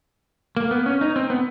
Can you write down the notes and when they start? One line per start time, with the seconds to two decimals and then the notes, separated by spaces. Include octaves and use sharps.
0.57 A#3
0.71 B3
0.86 C#4
1.01 D#4
1.16 C4
1.30 B3